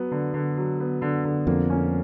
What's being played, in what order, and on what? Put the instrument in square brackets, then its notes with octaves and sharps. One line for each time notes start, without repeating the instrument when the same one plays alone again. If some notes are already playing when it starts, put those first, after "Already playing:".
Already playing: [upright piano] F#3 B3
D3
D3
F#3
B3
D3
D3
[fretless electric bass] F2 [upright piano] A#3
[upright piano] C#4